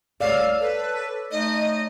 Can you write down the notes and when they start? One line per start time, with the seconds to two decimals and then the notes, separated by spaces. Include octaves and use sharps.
0.20 C2 A3 C#5 D5 F5 E6
0.61 A4 B4
1.31 A3 D#4 D#5